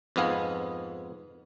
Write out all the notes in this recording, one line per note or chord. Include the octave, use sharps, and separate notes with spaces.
F2 G#2 B3 F5 G#5